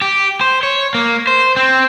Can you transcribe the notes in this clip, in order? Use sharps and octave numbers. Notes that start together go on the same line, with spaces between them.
G4
C5
C#5
A#3
C5
C4